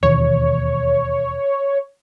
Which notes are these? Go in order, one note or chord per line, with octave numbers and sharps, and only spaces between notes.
E1 D#2 C#5